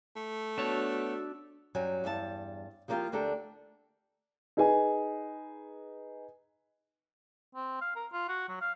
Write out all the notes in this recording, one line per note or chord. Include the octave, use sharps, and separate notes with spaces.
A3
B3 D4 F#4 C#5 A5 E6
F#2 F#3 G3 G#5
E2 G2 G#4 A5
F3 G3 A#3 D4 F4 G4
D2 A#3 D4 G4 A4 A5
D#4 G#4 B4 G#5
C4
F5
A#4
F4
F#4
F#3
F5